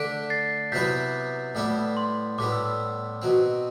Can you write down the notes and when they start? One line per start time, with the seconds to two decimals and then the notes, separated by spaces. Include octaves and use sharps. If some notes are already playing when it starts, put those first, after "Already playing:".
Already playing: D3 A3 D4 B6 D7
0.30 A6 C7
0.72 C3 F#3 B3 E4 B4 G6 B6
1.55 A2 G3 B3 E4
1.97 C6
2.38 A2 G3 B3 D6
2.52 E6
2.66 E6
2.80 E6
3.22 B2 F#3 C4